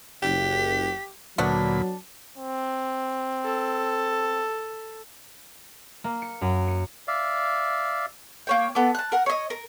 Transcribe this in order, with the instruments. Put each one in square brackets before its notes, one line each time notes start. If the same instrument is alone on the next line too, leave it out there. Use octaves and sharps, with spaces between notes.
[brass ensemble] F#1 [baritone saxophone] G4 [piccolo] B6
[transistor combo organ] D2 A#2 B5 [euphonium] F#3 [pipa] A3 B3 D4
[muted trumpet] C4
[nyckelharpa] A4
[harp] A#3
C#7
F#2
C#7
[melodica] D5 E5 F5
[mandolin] A#3 C#5 G5
B3 A4 D6
A5 F#6
A#4 F#5
C#5 D#5
A#4